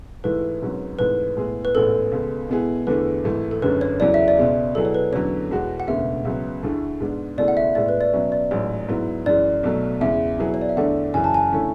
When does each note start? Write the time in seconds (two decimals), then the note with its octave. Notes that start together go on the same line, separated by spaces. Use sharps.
0.24 G#2 E3 A3 E4 B4
0.62 G#1 G#2 F#3 C#4
0.99 G#1 G#2 E3 A3 B4
1.37 A2 G#3 B3 E4 G#4
1.65 B4
1.75 A1 G#2 G#3 B3 A4
2.12 C#2 B2 G#3
2.49 B2 G#3 B3 E4 G#4
2.87 E2 D3 A3 E4 G#4 B4
3.24 G#1 G#2 E3 A3
3.51 A4
3.62 G#1 F#2 D3 G#3 C#4 B4
3.81 C#5
4.00 E2 C#3 F#3 B3 E4 D5
4.14 E5
4.28 D5
4.37 C#2 B2 G#3
4.75 B2 F#3 B3 E4 G#4 A4
4.85 C#5
4.94 B4
5.12 E2 D3 F#3 C#4 C#5
5.51 E2 B2 G#3 B3 F#4
5.80 F#5
5.87 E1 D2 C#3 G#3 B3 E5
6.25 C#2 C#3 F#3 B3
6.63 D2 D3 A3 E4 G#4
7.00 G#2 G#3 B3 D4
7.38 C#2 B2 A3 E4 G#4 D5
7.48 F#5
7.57 E5
7.75 A2 G#3 B3 D5
7.89 B4
8.01 D5
8.13 B2 F#3 C#4 E5
8.32 D5
8.51 A1 G#2 F#3 C#5
8.88 G#2 F#3 B3 E4
9.26 F#2 E3 G#3 D5
9.63 B1 B2 F#3 A3
10.01 E2 C#3 G#3 E5
10.39 B2 F#3 B3 E4 G#4
10.54 C#5
10.62 D5
10.69 E5
10.77 E2 D3 A3 D4 F#5
11.14 F#2 C#3 E3 G#5
11.24 A5
11.34 G#5
11.52 D3 A3 C#4 E4